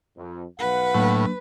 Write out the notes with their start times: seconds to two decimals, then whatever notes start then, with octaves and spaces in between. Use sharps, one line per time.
0.17 F2
0.59 B1 B4 F5 F#5
0.95 A2 F#3 A#3 D4